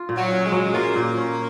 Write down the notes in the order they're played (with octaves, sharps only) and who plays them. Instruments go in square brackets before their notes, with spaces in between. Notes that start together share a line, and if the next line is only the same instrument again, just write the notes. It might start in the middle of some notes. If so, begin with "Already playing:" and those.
Already playing: [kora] F4
A#2
[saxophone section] F#3
[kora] C#4
[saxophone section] G#3
[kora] F#3
[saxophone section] A#3 [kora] F4
[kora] A#2
C#4